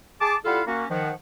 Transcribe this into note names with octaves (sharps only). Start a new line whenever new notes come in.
G#4 A5 D6
G3 E4 F4 A4 F5 F#5
A#3 C#4 F#4
D#3 F3 F#5